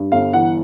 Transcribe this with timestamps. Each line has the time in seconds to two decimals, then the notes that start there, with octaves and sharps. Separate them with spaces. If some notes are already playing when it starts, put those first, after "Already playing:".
Already playing: G2
0.12 G1 F5
0.33 E3 F#5